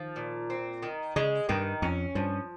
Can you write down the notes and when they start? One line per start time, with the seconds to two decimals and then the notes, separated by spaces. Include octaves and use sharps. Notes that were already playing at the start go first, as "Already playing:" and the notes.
Already playing: D#3 F3
0.16 A#2
0.50 C4
0.83 D#3
1.16 C#3 G#3
1.49 G2 D#3
1.82 F2 C#4
2.15 G2 F3